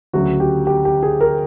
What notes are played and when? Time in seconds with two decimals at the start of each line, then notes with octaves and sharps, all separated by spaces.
0.13 D2 C#3 F#3 F#4
0.40 G4
0.67 G4
0.85 G4
1.03 G#4
1.21 A#4